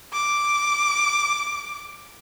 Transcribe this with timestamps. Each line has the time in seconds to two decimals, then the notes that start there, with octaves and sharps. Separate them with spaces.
0.13 D6